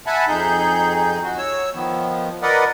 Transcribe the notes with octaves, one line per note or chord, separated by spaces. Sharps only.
E5 F#5 G#5 A5 B5
F2 D#4 G#4 G6
F#4
C#5 E6
D#3 F3 B3
A#4 B4 D5 D#5 F#5